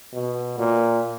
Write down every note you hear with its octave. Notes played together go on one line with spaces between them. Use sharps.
B2
A#2